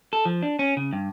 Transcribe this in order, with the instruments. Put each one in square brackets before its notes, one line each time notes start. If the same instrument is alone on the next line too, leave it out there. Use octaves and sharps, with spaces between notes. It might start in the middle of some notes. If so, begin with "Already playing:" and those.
[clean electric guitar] A4
F3
D4
C#4
C#3
G2